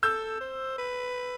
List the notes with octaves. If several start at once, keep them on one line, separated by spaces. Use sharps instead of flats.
A4 E6 G6
C5
B4